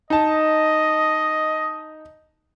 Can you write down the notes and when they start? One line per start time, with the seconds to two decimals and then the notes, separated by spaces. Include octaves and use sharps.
0.10 D#4 D#5 A5